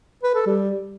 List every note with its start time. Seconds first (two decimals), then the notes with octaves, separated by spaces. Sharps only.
0.23 B4
0.35 A4
0.46 G3